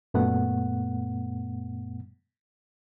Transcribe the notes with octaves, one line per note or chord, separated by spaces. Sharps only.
F#2 A#2 A3 B3 F#5